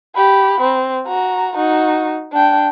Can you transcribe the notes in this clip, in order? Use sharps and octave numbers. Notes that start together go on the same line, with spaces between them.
G4 B5
C4
F#4 A#5
D#4 F#4
D4 G5